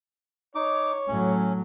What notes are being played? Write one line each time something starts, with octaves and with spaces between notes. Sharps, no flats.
D#4 C#5 D6
A2 F#3 C#4